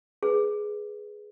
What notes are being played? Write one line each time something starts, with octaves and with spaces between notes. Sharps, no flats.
G#4 B4